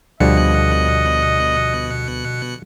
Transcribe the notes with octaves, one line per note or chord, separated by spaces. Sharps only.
D2 B2 D3 F3 G3 D#5 F#6 C#7